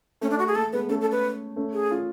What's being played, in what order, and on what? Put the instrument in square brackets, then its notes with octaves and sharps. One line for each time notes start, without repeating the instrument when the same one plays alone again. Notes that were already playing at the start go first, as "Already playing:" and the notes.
[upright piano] A3 [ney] C#4
[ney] D4
F#4
G#4
[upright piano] A3 [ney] A4
[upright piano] G#3 B3 [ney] B4
[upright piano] A3 C#4 [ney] A4
[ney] A4
B4
[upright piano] A3 C#4
[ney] G#4
[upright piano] C#4 F4